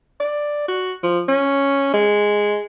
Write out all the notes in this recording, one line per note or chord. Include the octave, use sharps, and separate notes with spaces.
D5
F#4
F3
C#4
G#3